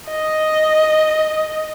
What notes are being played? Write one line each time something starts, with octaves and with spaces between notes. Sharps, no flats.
D#5